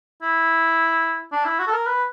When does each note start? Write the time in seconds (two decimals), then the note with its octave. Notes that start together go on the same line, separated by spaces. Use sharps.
0.22 E4
1.32 D4
1.45 E4
1.59 F#4
1.67 A4
1.73 A#4
1.87 B4